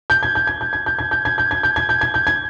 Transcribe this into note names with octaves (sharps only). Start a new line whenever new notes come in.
G6
G#6
G6
G#6
G6
G#6
G6
G#6
G6
G#6
G6
G#6
G6
G#6
G6
G#6
G6
G#6